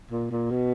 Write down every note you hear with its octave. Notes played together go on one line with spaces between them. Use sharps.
A#2
A#2
B2